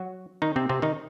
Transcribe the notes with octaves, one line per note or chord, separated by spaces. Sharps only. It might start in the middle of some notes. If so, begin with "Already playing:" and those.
Already playing: F#3 F#4
D#3 D#4
C3 C4
C3 C4
D#3 D#4